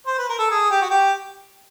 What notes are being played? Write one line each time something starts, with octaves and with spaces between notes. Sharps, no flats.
C5
B4
A#4
A4
G#4
G4
F#4
G4